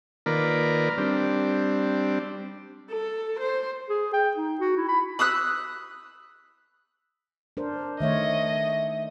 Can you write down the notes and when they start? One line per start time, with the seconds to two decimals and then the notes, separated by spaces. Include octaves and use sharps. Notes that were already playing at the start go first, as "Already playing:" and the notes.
0.26 D#3 A#3 F4 A#4 B4 D5
0.98 G3 C4 D4
2.90 A4
3.40 C5
3.89 G#4
4.13 G5
4.37 D#4
4.60 F#4
4.76 E4
4.88 B5
5.19 B5 D#6 E6 F#6
7.57 D4 A#4 C5
8.00 D#3 A3 C#5 D#5 E5